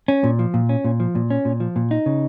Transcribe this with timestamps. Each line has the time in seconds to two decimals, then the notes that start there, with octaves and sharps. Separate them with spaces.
0.08 C#4
0.24 A#2
0.39 F3
0.54 A#2
0.69 C#4
0.85 A#2
1.00 F3
1.15 A#2
1.30 C#4
1.45 A#2
1.60 F3
1.76 A#2
1.91 D#4
2.06 C#3